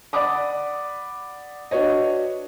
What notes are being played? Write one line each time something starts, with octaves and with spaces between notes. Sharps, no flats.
D5 F#5 B5 D6 D#6
D4 F#4 B4 C#5 D#5